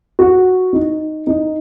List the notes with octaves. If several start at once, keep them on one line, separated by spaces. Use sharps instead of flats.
F#4
D#4
D#4